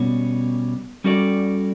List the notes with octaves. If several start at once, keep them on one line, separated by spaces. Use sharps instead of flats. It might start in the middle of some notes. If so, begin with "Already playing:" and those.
Already playing: B2 G3 C#4
G3 C#4 F#4 A4 D5